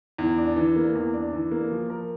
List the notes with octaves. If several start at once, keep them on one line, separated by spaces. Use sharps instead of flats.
E2
D4
E3
A#3
E2
D4
E3
A#3
F3
A#4